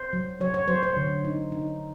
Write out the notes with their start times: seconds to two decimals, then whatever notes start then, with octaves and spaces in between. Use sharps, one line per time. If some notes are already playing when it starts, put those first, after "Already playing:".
Already playing: C5
0.13 F#3
0.40 F#3 C#5
0.54 C#5
0.68 F#3 C5
0.83 C5
0.97 D3
1.25 D#4
1.52 D#4